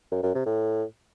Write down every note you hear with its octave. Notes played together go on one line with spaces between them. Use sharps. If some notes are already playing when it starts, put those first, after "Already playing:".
F#2
F#2
C3
A2